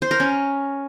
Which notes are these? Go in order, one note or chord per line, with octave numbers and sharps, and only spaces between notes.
C5
A#4
C#4